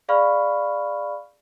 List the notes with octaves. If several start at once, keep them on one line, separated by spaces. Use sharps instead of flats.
G#4 D5 F5 B5 C#6 F6